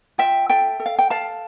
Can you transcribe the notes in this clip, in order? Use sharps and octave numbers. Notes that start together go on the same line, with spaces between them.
F4 E5 G5
A4 E5 G5
A4
F5
G5
A4 F5 A5